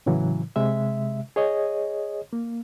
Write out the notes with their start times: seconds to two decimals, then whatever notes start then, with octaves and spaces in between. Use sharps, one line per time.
0.06 A2 C#3 E3 F#3
0.56 C3 G#3 E5
1.36 G#4 C#5 D#5
2.33 A#3